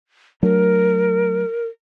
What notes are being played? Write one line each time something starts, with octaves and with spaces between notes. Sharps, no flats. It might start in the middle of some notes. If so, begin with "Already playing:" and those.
F#3 A3 D4 A#4